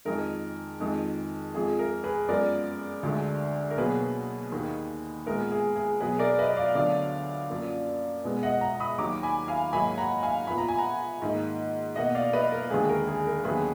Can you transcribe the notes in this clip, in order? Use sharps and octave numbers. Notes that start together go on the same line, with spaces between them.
F2 D#3 G#3 A#4
F2 D#3 G#3
F2 F3 G#3 G#4
A#4
G#4 B4
F#2 F3 G#3 B3 A#4 D5
D2 D3 G#3
A#4
B2 F#3 A#3 G#4 B4
D#2 D#3 A#3
A#2 G#3 B3 A#4
G#4
G#4
B2 F#3 B3 G#4 B4
A#4 D5
B4 D#5
D5 F5
D2 D3 F#3 B3 D5 F5
F#2 F3 A#3
B2 G#3 B3
D#5 F#5
F#5 A#5
B5 D#6
D#2 D#3 F#3 A#5 D6
G#5 B5
F5 G#5
G#2 F#3 A#3 G#5 B5
F#5 A#5
F5 G#5
A#2 F3 B3 B5
A#5
G#5
F#5 A#5
G#2 D#3 A#3
B2 A#3 D#5 F#5
D5 F5
B4 D#5
A#4
D#2 D3 G#3 G#4 B4
A#4
G#4
A#4
D#2 D3 F#3 B3 G#4 B4